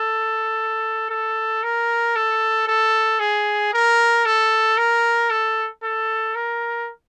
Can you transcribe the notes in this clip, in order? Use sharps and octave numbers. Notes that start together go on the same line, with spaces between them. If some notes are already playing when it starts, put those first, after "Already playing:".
Already playing: A4
A4
A#4
A4
A4
G#4
A#4
A4
A#4
A4
A4
A#4